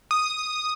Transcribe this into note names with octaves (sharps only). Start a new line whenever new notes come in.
D#6